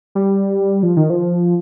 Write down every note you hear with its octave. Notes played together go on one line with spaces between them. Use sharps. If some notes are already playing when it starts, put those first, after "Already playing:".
G3
F3
D#3
F3